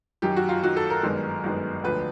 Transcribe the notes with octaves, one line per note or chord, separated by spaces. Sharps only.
F#2 D#3 F#3 G4
F#4
F4
F#2 D#3 F#3 F#4
A4
A#4
G1 F#2 D#3 G#3 B3
G1 F#2 D#3 G#3 B3
E1 D2 D3 F3 B4